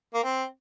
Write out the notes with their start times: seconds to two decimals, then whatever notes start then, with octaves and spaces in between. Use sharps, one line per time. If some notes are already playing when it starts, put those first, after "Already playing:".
0.14 A#3
0.23 C4